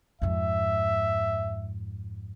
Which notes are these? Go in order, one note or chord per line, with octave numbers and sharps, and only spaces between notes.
F2 G#2 E5